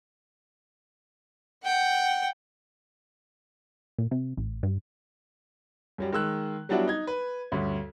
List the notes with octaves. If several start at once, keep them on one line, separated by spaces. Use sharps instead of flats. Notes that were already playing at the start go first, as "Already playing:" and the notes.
F#5 G5
A#2
C3
A1
G2
F#2 F#3 G3
D#3 G#3 E6 F#6
F#3 G3 B3 D4 E4 F#4
D#4 G#6
B4
D2 G2 C#4